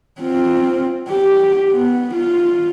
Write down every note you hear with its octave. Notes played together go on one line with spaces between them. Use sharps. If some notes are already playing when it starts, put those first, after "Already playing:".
C4 F4
G4
B3
F4